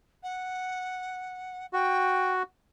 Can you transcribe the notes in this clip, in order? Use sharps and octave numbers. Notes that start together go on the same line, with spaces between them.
F#5
F#4 G5